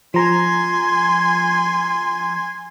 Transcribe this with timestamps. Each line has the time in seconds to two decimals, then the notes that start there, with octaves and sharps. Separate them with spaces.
0.14 F3 G#5 A#5 C6